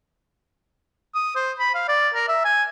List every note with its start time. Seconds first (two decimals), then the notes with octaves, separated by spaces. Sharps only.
1.15 D#6
1.35 C5
1.59 B5
1.75 F5
1.88 D5
2.14 A#4
2.28 E5
2.45 G#5